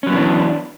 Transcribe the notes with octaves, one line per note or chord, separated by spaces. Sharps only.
E3 F#3 B3 C#4 D4